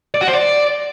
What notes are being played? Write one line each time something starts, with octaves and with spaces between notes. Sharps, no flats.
D5
F#4
C5
D5